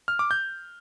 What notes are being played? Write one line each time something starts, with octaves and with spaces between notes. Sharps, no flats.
F6
D6
G6